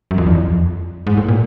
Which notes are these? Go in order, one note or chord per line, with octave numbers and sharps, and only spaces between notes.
F#2
F2
E2
F2
G#2
A2
A#2